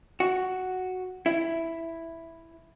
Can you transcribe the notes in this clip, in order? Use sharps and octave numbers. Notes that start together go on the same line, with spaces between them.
F#4
E4